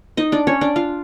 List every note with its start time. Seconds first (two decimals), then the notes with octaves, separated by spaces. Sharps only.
0.17 D#4 D#5
0.32 D4 D5
0.47 C#4 C#5
0.61 D4 D5
0.76 F4 F5